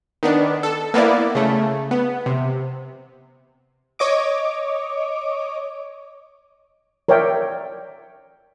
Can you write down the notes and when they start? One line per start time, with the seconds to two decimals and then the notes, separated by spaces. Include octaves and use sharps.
0.23 D#3 B3 D4
0.63 A4
0.94 A#3 B3 E4 D5
1.35 C#3 A3
1.91 B3
2.26 C3
3.99 C#5 D#5 D6
7.08 A#4 C#5 D5 E5 G5